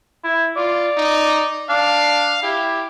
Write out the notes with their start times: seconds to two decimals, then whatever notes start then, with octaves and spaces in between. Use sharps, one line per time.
0.24 E4
0.56 F4 D5
0.97 D#4
1.69 D4 F5
2.43 E4 G4